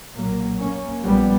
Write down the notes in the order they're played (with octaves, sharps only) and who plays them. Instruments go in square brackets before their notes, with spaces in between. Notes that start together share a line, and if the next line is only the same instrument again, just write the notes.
[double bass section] B1 A#2 F#3 A#3
A#3 C#4
A#1 A#2 G3 B3